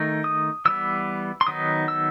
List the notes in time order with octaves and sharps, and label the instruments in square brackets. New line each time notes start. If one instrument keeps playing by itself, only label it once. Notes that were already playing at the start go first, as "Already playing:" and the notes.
Already playing: [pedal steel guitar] D#3 A3 D#4
D#6
E3 G3 B3 E6
C6
D#3 F#3 B3 D#4 D#6
E6